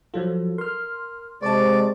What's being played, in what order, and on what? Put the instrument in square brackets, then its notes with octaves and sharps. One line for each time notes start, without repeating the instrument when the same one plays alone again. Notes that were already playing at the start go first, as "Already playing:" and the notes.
[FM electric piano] F3 F#3 F4 [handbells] A4
[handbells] A#4 F6 [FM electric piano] C6
[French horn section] C3 G#3 [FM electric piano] C5 A5 [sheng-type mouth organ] D5 [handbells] C#6